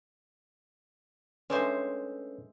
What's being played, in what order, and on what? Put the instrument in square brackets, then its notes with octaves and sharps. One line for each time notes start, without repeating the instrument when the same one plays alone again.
[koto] G#3 A3 C5 [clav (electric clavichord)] C#4 [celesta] D4 A4 B4